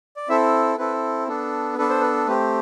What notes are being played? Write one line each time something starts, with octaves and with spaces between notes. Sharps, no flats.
D5
C4 E4 A4 E5
C4 E4 A4 B4
B3 D4 A4
B3 D4 A4 B4
C5
B4
A3 C4 G4 B4